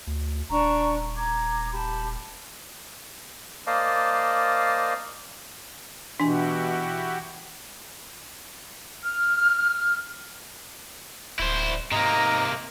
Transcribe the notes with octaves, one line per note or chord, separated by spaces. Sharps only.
D2
D#1 D4 A#5 C#6
A#5 D6 G#6
G4 A5 B5
A#3 C5 D5 D#5 F5 A5
B2 E3 D4 E4 F#4 G4 G#5
F6
D1 E4 C5
G#2 C3 A#3 D#5 A#5